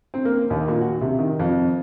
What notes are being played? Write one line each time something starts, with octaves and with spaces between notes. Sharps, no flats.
C4
A#3
D#2
A#2
F#4
C3
D#3
F2